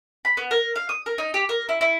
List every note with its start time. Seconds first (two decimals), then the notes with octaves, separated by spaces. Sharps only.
0.25 B5
0.37 B3
0.51 A#4
0.76 F5
0.89 D#6
1.06 A#4
1.18 D#4
1.34 G4
1.49 A#4
1.69 E4
1.81 E4